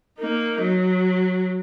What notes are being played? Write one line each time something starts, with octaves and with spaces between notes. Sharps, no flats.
A#3 D#4
F#3